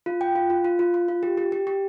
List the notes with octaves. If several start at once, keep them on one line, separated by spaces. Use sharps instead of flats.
F4
G5
F4
F4
F4
F4
F4
F4
G4
G4
G4
G4